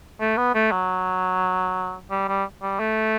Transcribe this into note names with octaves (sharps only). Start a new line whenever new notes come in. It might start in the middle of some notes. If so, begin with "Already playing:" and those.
A3
B3
A3
F#3
G3
G3
G3
A3